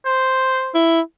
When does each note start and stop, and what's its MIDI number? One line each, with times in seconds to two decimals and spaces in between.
0.05 0.74 72
0.74 1.01 64